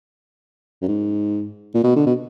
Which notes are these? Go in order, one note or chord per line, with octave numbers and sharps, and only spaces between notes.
F#2
G#2
A#2
B2
D3
B2